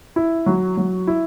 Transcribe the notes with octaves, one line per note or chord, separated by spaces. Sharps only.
E4
F#3
F#3
E4